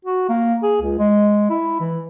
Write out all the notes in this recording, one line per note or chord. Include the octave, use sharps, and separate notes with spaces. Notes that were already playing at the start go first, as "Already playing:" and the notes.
F#4
A#3
G#4
C#2
G#3
E4
E3